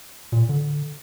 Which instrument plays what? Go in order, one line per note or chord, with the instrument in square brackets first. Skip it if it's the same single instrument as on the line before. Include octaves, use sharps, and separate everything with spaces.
[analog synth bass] A#2
D3